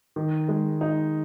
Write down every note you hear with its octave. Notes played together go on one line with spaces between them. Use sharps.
D#3
G#3
D#4